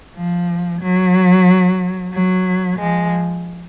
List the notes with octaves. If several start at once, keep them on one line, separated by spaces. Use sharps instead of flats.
F3
F#3
F#3
F3 G#3